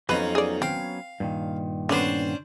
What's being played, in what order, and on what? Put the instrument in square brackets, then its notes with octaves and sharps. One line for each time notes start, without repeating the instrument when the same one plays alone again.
[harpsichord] F2 D#4 A#5 [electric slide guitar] F#3 B3 C#4 [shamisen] B4
[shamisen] G#4 D5
[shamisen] C4 [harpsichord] F5
[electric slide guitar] G2 A#2 D#3
[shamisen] D3 B3 [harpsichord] C#4 D4 C5